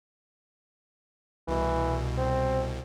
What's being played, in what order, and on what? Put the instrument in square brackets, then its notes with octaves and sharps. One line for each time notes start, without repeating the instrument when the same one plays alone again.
[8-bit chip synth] C2 B2 [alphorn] E3
[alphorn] C4